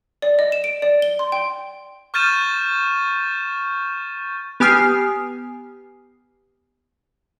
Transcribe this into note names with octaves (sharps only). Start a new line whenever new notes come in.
D5
D#5
E7
D7
D5
G7
C6
G5
C#6 F6 G6 A6 D#7 E7
B3 G4 G#5 D#6 F6 C7